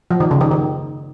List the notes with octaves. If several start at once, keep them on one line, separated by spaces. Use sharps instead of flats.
F3
D#3
C#3
D#3
D#3